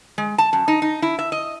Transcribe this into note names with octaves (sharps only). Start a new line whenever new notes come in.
G#3
A5
F#2
D#4
D#4
E4
E5
D#5